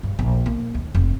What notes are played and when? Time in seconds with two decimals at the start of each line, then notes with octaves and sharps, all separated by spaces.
0.03 G2
0.19 A#1
0.46 A#3
0.74 D#2
0.95 F1